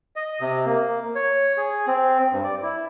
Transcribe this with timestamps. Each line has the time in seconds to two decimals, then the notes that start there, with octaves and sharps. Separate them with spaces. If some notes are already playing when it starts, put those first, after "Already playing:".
0.16 D#5
0.41 C3
0.65 A#3
1.15 C#5
1.57 G#4
1.87 C4
2.32 G2
2.44 D5
2.62 E4